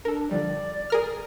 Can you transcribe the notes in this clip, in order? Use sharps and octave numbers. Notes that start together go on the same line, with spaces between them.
D4 A4 A#4
D3 F3 G3 D5
G#4 A#4 F6